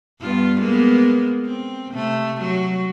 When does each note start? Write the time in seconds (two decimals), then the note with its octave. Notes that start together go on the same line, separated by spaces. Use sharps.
0.20 G2 B3 F4
0.59 G#3 A#3 B3
1.45 C4
1.92 C3 A3
2.41 F#3